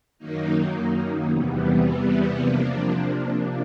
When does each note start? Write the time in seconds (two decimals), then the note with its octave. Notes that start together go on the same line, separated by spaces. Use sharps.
0.18 F#2 D#3 F#3 A#3 D#4
1.30 E2 C3 E3 G3 B3
2.39 C3 F3 A#3 D4